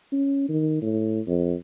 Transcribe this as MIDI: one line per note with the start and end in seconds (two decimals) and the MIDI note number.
0.12 0.49 61
0.49 0.80 51
0.82 1.20 45
1.27 1.54 41